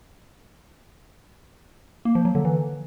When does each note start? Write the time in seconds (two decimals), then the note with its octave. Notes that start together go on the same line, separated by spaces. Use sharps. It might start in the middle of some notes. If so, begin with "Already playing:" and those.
2.05 A#3
2.15 F3
2.25 F#3
2.35 D3
2.45 E3